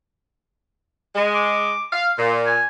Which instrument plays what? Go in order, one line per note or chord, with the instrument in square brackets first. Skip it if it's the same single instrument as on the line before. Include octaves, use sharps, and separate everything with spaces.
[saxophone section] G#3
[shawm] D6
[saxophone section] F5
[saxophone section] A#2 [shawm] C6
[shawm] G#5